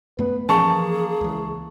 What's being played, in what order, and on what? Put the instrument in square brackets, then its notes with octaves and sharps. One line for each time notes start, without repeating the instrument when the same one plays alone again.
[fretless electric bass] F#2 A3 B3 [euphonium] B4
[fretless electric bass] E3 F3 C#4 [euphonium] A#3 [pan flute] G#4 [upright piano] A5 C#6
[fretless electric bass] C#2 E3